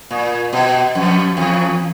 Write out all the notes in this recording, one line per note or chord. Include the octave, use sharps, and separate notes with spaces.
A#2
B2
F2
E2